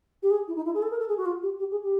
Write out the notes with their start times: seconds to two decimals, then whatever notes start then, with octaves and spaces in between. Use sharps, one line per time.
0.23 G4
0.31 G#4
0.48 E4
0.56 D#4
0.65 E4
0.74 G#4
0.82 A4
0.91 A#4
0.99 A4
1.09 G#4
1.17 F#4
1.25 F4
1.43 G4
1.59 G4
1.71 G#4
1.83 G4